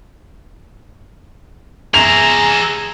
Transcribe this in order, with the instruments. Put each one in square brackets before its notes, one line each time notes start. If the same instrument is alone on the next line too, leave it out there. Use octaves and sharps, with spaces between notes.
[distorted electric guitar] G#4 E5 [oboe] A#5 [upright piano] F7